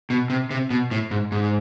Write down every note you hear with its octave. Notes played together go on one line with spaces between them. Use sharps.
B2
C3
C3
B2
A2
G#2
G#2